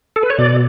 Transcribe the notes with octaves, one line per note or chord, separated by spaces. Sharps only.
A4
B4
C#5
B2 D5